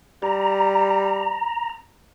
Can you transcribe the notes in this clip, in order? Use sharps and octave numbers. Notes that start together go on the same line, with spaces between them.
G3 A#5